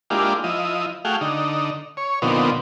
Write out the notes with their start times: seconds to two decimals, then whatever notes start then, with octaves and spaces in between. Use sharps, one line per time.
0.10 G#3 A#3 D4 E4 F4 G4
0.44 F3 E4 D#5
1.05 A3 F#4 G#4 F5 G5
1.21 D3 D#4
1.97 C#5
2.22 A#2 D3 F3 B3 C4 D#4